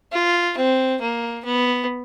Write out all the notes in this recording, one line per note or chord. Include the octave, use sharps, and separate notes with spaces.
F4
C4
A#3
B3